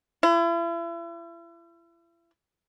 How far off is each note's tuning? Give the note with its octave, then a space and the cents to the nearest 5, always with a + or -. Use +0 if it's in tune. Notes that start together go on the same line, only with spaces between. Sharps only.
E4 +40